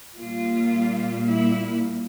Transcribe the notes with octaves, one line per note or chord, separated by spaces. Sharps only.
A#2 G3 A#3 F4
E4